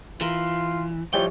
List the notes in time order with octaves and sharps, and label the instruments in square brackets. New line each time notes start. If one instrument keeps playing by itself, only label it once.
[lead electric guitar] E3 [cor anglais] F4 [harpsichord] A#4
[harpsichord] E3 F3 G3 [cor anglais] C#5 [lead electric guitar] G5